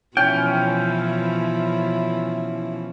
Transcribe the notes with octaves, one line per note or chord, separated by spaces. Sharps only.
B2 E3 F3 C#4 E4 G5